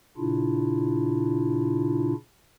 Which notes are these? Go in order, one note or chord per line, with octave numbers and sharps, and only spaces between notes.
A#2 C#3 D4 E4 F4